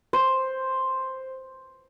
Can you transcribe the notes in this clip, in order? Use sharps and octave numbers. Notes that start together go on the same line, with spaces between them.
C5